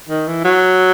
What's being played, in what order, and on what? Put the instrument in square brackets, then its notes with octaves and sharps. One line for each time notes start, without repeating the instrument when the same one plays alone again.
[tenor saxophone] D#3
E3
F#3